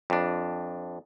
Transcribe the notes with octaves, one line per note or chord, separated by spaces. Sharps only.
F2 D4